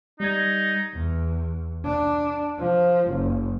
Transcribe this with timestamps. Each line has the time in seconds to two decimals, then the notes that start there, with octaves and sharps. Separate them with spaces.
0.20 G3 D#4 G#6
0.95 E2
1.85 D4
2.59 F3
3.10 F#1